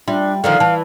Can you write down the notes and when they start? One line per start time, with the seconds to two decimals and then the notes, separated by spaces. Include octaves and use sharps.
0.08 G3 D4 F4 E5 C6
0.44 D3 D#3 F3 F5
0.60 E3 A5